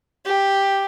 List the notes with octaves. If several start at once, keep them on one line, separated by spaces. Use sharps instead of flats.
G4